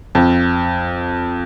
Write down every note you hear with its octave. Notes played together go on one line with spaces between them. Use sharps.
F2